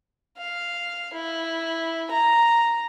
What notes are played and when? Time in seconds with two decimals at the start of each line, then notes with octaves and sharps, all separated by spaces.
0.38 F5
1.14 E4
2.11 A#5